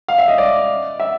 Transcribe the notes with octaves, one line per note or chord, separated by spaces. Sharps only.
F5
E5
D#5
D5
E5